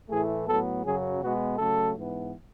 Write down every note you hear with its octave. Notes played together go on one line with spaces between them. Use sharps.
A2 E3 A3 G#4
A2 F#3 B3 A4
F#2 C#3 F#3 G#4
B2 G#3 B3 F#4
C#3 F#3 A3 A4
G#2 E3 B3